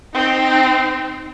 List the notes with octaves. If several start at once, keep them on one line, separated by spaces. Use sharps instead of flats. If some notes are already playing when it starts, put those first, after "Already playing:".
C4 D#4